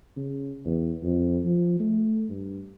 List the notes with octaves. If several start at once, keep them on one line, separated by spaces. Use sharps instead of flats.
C#3
E2
F2
F3
A3
G2